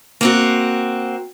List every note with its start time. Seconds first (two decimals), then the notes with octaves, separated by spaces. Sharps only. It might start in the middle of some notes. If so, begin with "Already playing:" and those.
0.21 A#3 C4 F#4